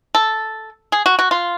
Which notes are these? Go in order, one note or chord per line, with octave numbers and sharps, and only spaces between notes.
A4
G#4
F#4
F#4
F4